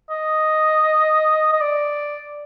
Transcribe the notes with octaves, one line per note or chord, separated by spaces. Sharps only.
D#5
D#5
D5